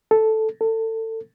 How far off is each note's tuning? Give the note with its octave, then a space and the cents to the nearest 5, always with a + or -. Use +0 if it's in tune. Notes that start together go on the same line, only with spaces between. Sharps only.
A4 -5
A4 +25